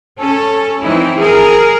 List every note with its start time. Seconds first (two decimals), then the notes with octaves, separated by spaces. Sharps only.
0.19 C#4 A4 C#5
0.82 E3 C4 D#4 E4
1.17 G#4 A#4